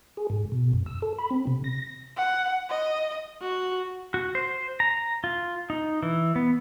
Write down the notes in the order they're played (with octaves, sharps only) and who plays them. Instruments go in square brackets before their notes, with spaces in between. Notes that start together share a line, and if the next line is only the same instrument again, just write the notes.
[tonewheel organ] G#4
G#2
B2
F#2
E6
A4
B5
C4
C3
A#6
[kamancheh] F#5
D#5
[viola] F#4
[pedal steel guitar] F#4
C5
A#5
F4
D#4
E3
B3